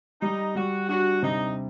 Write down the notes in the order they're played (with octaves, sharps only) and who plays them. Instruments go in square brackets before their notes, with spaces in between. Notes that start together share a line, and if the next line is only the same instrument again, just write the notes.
[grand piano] G3 [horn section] D#4
[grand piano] G3 [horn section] F#4
[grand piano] D4 [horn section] F#4
[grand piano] C3 [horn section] D#4